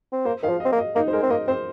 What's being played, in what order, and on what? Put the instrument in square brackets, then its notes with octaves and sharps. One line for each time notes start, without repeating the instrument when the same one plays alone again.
[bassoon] C4
[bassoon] A#3 [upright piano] C5
[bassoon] D#3 [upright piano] F5
[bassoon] F3
[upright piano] D#5
[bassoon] C4
A#3
[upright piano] D#5
[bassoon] A#3 [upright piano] D#4
[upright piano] C5
[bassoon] G#3 [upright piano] A#4
[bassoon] C4
[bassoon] A#3 [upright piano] D#5
[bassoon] C4 [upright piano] C5